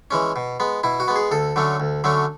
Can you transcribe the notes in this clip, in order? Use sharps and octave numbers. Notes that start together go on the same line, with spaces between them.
E3 G#3 C#4
B2
G#3 B3
B2 E4
F#4
G#3 B3
G#4
D2 A4
D3 F#3 A3 C#4
D2
D3 F#3 A3 C#4